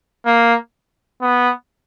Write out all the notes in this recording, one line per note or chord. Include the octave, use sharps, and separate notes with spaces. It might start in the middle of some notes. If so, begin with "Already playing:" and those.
A#3
B3